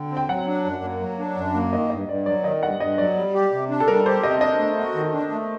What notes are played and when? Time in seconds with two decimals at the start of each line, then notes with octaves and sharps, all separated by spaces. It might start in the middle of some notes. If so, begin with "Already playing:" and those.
Already playing: D3 G5
0.11 C4
0.17 G5
0.29 F#3 F#5
0.47 D4
0.64 F#2
0.83 A#3
1.01 F#3
1.19 D4
1.37 F#2
1.54 A#3
1.73 D#3 D#5
1.90 G2 D#5
2.09 G2 D5
2.26 F#3 D5
2.44 D#3 D#5
2.62 G2 F#5
2.80 G2 D#5
2.98 F#3 D5
3.16 G3
3.34 G4
3.52 C3
3.70 D4
3.80 A4
3.88 G3 A#4
4.06 G4 C5
4.23 C3 D#5
4.41 D4 D#5
4.59 A3
4.78 F#4
4.95 D#3
5.13 D4
5.31 A3